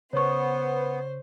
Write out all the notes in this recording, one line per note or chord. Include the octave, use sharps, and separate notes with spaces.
C#3 B3 C5 C#5 C#6